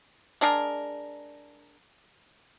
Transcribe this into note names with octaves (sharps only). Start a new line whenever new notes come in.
G#3 D4 G#4 A#4